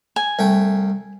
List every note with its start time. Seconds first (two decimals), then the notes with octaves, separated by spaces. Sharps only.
0.16 G#5
0.39 C2 A3 G5